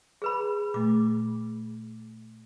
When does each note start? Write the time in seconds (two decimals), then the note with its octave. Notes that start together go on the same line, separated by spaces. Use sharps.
0.22 G#4 B4 B5
0.74 A#2 A3 D6